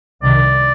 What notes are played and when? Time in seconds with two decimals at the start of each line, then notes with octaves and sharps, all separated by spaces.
0.23 C2 C3 D#3 D5